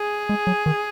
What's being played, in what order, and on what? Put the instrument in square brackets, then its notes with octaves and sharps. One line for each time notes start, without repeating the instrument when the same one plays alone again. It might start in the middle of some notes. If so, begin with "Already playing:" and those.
Already playing: [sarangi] G#4
[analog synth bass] G#3
F#3
D#3